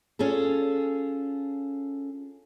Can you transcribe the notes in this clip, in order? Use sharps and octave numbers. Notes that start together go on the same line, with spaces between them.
C#4 F4 G#4 A4